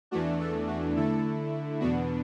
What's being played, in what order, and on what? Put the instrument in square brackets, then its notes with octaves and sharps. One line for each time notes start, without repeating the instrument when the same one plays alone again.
[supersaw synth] E2 E3 A3 D4 F#4
A4
F#4
D3 A3 E4 A4
E2 B2 B3 D4 F#4